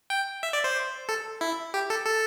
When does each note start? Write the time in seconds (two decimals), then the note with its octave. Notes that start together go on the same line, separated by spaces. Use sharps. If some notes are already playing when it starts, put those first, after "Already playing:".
0.10 G5
0.43 E5
0.53 D5
0.64 C5
1.09 A4
1.41 E4
1.74 G4
1.90 A4
2.06 A4